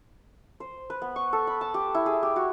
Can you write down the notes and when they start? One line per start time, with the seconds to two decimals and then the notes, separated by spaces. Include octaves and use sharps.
0.60 C5
0.90 B4
1.02 B3
1.16 C#6
1.33 A4
1.47 B5
1.61 A5
1.74 G4
1.95 E4
2.06 G#4
2.23 G4
2.36 F#4